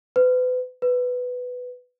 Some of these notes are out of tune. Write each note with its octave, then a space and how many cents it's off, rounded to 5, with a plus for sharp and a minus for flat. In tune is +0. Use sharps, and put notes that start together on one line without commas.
B4 +35
B4 +10